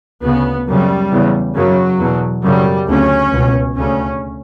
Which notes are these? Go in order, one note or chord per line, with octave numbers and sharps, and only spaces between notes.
D2 C#3 B3
F#2 C#3 G3
E2 C#3
F#2 C#3 F#3
E2 B2
F#2 C#3 G3
D2 C#3 C#4
C#2 B2
D2 C#3 C#4